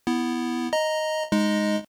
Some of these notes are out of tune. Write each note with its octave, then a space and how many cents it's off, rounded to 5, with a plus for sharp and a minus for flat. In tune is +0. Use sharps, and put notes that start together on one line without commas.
B3 +0 E4 +0
D#5 +0 A#5 +0
G#3 +0 D#4 +0 D#5 +0